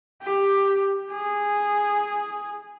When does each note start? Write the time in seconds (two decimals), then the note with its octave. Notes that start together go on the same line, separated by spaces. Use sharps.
0.22 G4
1.11 G#4